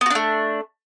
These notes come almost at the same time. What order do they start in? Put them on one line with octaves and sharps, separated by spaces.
B3 F#4 D4 A3